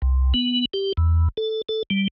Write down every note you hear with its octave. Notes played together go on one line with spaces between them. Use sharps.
C2
B3
G4
E2
A4
A4
G3